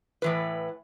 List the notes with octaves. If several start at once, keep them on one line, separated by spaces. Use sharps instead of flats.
A2 E3 B4